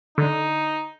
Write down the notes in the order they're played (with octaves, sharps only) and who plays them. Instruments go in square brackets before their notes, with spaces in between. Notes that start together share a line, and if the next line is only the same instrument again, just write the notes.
[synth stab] D3 [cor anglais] D#4